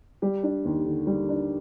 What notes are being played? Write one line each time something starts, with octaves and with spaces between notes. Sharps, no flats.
G3 G4
D4
D#2
D3
G3
D4